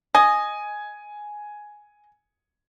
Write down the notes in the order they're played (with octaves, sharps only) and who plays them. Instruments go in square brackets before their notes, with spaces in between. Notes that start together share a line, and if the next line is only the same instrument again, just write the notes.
[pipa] D#5 [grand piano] G#5